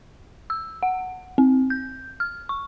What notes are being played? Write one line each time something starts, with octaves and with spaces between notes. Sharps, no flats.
E6
F#5
C4
G6
F6
C#6